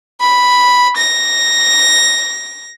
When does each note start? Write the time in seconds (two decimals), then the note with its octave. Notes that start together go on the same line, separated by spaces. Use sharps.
0.21 B5
0.97 A#6